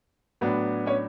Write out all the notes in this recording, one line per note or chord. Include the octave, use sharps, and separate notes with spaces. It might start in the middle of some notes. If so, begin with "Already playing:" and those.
A2 F#3 B3 D4
C#4 C#5